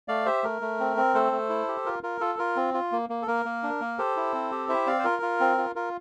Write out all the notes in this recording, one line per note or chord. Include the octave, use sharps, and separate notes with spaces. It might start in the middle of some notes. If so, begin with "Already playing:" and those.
A3 D5 F5
G4 C5 E5
A3 A#4
A3
C4
C4
A3 A4 C5
A3
E4
G4
F4 A#4
F4 A#4
F4 A4
F4 A#4
C4
F4
A#3
A#3
A4
A#3 A#4
A#3
D4
A#3
G4 A4 C5
E4
C4
G4
E4 C5 E5
C4 D5 F5
C5
F4 A#4
F4
C4
F4
F4 A#4